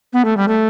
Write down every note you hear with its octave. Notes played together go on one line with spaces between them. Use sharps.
B3
A3
G3
A3